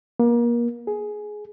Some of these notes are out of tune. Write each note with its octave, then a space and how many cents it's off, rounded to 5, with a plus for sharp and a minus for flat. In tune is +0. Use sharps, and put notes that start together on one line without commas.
A#3 +30
G#4 +10